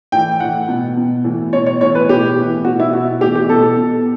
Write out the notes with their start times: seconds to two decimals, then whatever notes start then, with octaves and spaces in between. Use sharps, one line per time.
0.12 A2 E3 G5
0.40 A2 E3 F#5
0.68 B2
0.97 B2
1.24 A2 E3
1.52 B2 C#5
1.66 C#5
1.81 A2 C#5
1.85 E3
1.95 B4
2.09 B2 G4
2.37 A2 E3
2.65 B2 F#4
2.80 E4
2.93 B2 F#4
3.21 A2 E3 G4
3.36 G4
3.49 B2 A4
3.77 B2